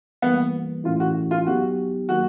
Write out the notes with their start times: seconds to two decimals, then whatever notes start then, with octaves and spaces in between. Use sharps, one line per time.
0.22 E3 G3 A#3 B3
0.84 A2 E3 A3 C#4 E4 F4
1.00 F#4
1.31 F4
1.47 F#3 B3 D#4 F#4 G4
2.09 D#3 F#3 A#3 F#4